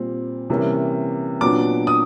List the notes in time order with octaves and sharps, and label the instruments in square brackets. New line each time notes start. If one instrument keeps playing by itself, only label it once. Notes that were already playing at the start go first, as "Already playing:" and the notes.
Already playing: [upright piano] A#2 G3 C4
C3 E3 G3 A#3 C#4
A#2 F#3 B3 D4 D6
D#6